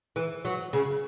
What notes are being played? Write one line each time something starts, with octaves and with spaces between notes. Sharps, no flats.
E3
F#3
C#3